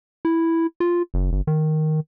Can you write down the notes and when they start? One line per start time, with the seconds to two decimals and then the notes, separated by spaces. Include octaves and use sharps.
0.25 E4
0.80 F4
1.14 F#1
1.32 G1
1.47 D#3